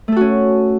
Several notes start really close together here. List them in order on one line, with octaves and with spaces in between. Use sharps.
A3 A4 F#4 C#4